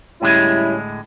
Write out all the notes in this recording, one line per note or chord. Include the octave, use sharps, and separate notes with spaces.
A2 D3 G3 G#3 C#4 E4